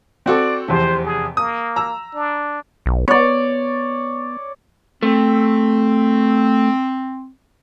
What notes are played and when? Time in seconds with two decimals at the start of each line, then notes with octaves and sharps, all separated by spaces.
0.26 C4 F#4 A4 D5
0.68 F1 E2 C3 C5
1.05 G#4
1.37 A#3 D#6
1.76 A#5 E6
2.15 D4
2.86 B1
3.08 B3 C#5 D5
5.03 A3 C4